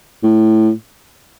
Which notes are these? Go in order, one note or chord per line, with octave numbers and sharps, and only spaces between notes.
A2